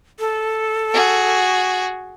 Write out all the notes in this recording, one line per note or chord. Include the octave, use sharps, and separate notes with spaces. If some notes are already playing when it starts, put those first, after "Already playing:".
A4
F#4 G#4